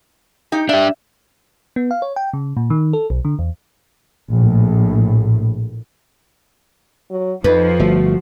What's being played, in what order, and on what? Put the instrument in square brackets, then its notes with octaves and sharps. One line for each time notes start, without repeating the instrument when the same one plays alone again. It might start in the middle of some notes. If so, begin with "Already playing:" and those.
[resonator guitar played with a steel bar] D#4 G4
[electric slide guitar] D4 G4 [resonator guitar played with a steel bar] E5
[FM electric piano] B3
F5
C#5
G5
C#3
A#2
D#3
A4
B1
D3
E2
[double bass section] A#1 A2
[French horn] F#3
[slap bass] F2 [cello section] F3 [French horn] D#4 [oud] B4
[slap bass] G1 A3 [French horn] F#4